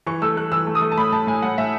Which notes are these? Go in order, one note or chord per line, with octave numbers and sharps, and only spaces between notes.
E3 C#6
A3 E6
A3 F#6
E3 E6
A3
D#6
A3
A5
A2 B5
A2 A5
A2 G#5
A2 F#5
A2 E5